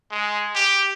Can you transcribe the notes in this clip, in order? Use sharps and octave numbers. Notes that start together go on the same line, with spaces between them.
G#3
G4